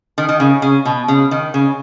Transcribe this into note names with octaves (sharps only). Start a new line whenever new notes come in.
D#3
D#3
C#3
C#3
B2
C#3
D#3
C#3